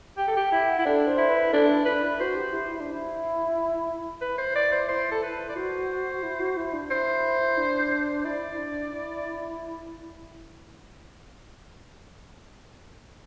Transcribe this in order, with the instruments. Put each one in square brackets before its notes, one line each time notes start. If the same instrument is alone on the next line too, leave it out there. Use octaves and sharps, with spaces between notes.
[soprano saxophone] G4 [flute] G5
[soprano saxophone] A4
[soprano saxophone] G4 [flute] G5
[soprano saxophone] E4 [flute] G5
[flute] F#5
[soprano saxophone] E4
[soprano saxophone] D4 [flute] A4
[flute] C5
[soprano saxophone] E4
[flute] B4
[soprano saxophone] D4 [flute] A4
[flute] E4
[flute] D4 [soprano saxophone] B4
[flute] E4
[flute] F#4 [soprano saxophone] C5
[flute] G4
E4
E4
D4
E4
[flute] E4 [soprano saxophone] B4
[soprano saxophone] C5
D5
C5
C5
A4
B4
D5
[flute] F#4 [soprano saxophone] C5
[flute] E4
F#4
E4
D4
[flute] E4 [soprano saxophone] C5
[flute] D4
[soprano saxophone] C5
[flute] E4 [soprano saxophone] D5
[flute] D4
E4